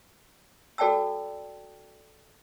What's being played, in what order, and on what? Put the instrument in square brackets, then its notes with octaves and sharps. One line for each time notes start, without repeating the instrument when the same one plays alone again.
[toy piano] F#4 A4 D5 G5 A5 E6